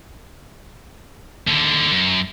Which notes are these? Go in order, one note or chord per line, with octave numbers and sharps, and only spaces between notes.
D#2 D3
F#2